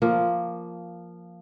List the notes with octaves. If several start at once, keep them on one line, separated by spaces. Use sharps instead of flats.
F3 A#3